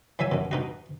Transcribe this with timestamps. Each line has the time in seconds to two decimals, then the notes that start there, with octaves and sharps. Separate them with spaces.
0.19 E3 F#3 E5 G#5
0.32 F#2 B2
0.51 B2 D#4 F#4